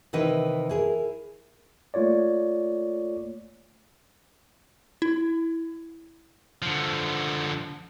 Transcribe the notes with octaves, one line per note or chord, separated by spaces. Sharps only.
C3 D#3 E3 D#4 E4 B4
E4 G#4 A#4
A3 A#3 F4 C#5 D5
E4
D3 F3